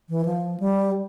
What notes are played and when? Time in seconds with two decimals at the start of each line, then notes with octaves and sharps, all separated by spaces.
0.09 E3
0.25 F3
0.60 G3